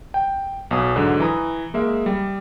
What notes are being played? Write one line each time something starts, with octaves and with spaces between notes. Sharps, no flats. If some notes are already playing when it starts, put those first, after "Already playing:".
G5
B1 B2 G#5 D#6
G#2 D3 F#3
E3 A#5 D#6
G#3 A#3 E5
G3